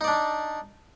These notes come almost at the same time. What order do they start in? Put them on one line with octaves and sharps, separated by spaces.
D#4 D5 D4